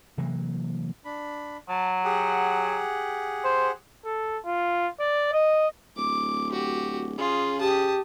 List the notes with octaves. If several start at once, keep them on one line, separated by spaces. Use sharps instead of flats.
C3 E3 F#3 A#3
D4 B5
F#3 A5
G4 G#4 F#5
C5
A4
F4
D5
D#5
D1 D6
F#4 G4
C#3 F4 G#4
G4 A5 D#6